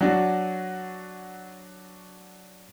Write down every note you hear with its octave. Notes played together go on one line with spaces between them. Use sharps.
F#3 D4 F#4